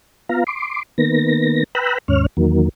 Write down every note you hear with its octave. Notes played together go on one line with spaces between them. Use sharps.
B3 F4 F5 A#5
C6 D6
D#3 A#3 B3 A#6
B4 G5 A#5 B5 E6 F#6
D#2 G#2 C#4 C#5 F6
E2 D#3 F#3 A#3